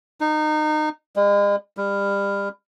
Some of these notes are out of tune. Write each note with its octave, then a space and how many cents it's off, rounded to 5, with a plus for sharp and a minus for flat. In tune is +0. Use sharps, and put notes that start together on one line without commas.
D#4 -25
G#3 -40
G3 +30